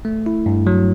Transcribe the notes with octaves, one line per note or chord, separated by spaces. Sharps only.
A3
E4
G2
F#3